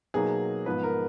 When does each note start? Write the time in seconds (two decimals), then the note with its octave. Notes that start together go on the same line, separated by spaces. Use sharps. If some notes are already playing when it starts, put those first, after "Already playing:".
0.14 B2 F#3 A#3 D#4 G#4
0.66 G#2 F3 B3 B4
0.83 A#4